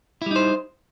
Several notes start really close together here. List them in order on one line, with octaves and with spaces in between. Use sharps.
E4 G3 D#4 C5